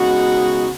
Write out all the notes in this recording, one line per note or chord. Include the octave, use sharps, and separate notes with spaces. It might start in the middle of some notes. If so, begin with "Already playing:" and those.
Already playing: C#3 G#3 B3 D#4 F#4